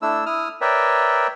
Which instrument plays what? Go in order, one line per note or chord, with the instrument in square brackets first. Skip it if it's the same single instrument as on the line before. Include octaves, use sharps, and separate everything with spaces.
[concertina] A3 D4 E4 E6
E4 D#6 F6
A#4 B4 C#5 D5 E5 G5